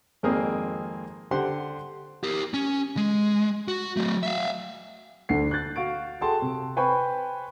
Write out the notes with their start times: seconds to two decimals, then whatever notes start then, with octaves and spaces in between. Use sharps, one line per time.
0.23 G#1 F2 A#3 C4 G#4 D#6
1.31 D3 G4 C5 F#5 C6
2.23 G4 A#4
2.54 C#4
2.97 G#3
3.68 F#4
3.97 F#3 A3
4.23 E5 F5
5.29 D2 D3 F#5 C7
5.51 F#6 G6 A6
5.76 F#4 F5 C#6 D7
6.21 G#4 A4 F#5 G5 A5 C6
6.42 C3
6.77 B4 C5 G5 G#5 B5 C#6